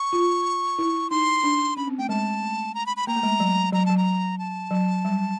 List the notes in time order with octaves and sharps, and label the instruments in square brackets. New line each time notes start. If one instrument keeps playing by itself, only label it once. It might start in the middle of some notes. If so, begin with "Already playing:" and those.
Already playing: [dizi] C#6
[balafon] F4
E4
[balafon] D#4 [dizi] C6
[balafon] D4
[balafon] C#4 [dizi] B5
[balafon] C4
[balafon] A3 [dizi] G5
[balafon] G#3 [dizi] A5
[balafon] A3
[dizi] A#5
B5
B5
[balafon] A#3 [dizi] A#5
[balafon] A3
G#3
F#3
[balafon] F#3 [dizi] A#5
[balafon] F#3 [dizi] A5
[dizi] A#5
A5
[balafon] F#3
G3